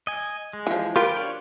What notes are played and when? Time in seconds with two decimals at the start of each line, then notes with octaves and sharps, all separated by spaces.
0.07 D#5 G#5
0.53 G#3
0.67 E3 F3
0.96 F3 F4 G4 A#4 B4 G5
1.16 D4 C#5 D5